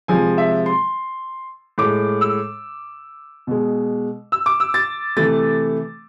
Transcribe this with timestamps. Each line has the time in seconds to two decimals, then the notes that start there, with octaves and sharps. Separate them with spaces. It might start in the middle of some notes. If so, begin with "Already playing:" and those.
0.08 C3 F3 G#3 G#5
0.38 E5
0.66 C6
1.78 A2 G#3 D6
2.21 E6
3.47 B2 G#3
4.32 E6
4.46 D6
4.60 E6
4.74 A6
5.17 C3 E3 A3 A6